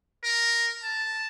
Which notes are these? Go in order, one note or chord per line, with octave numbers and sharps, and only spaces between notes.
A#4
A5